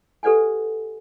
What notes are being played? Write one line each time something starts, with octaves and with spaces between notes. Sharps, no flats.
G4 A4 B4 D5 F#5 G#5